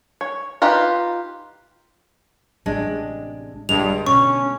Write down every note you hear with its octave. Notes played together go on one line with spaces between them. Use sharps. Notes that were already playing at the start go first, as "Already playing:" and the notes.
C#5
D#4 F4 G4 B4
A1 C3 G#3 D4
A#1 G2 D3 G#3 E4 F7
B2 B3 C#4 C#6